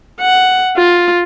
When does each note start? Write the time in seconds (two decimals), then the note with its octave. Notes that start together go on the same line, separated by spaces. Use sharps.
0.21 F#5
0.76 F4